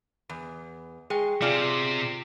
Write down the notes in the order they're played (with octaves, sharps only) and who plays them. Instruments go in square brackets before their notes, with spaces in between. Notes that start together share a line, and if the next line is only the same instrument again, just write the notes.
[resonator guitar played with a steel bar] E2
[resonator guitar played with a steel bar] G#3 [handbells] G#4 G5
[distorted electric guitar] C3 [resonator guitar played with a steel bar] F4 G#4 [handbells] D5